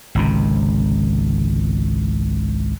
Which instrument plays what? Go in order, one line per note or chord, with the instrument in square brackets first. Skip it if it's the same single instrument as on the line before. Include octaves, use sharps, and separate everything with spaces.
[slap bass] G#1 C#2 C3